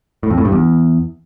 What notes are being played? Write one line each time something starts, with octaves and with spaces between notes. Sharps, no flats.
A2
F2
A2
G2
E2